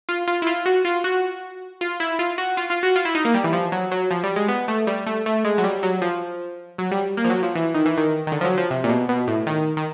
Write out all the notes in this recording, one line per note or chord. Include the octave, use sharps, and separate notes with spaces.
F4
F4
E4
F4
F#4
F4
F#4
F4
E4
F4
F#4
F4
F4
F#4
F4
E4
D#4
A#3
G3
E3
F3
F#3
F#3
F3
G3
G#3
B3
A3
G3
A3
A3
G#3
F#3
G3
F#3
F3
F#3
G3
A#3
F3
F#3
F3
E3
D#3
E3
D#3
D#3
D3
F3
F#3
F3
C3
A#2
B2
B2
A2
D#3
D#3